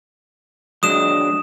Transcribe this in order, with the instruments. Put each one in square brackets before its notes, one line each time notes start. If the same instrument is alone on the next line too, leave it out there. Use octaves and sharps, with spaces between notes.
[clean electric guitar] F#3 G#3 D4 [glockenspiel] D#6 E7